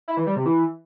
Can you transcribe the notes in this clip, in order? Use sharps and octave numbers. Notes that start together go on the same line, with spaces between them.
E4
E3
G3
C3
E3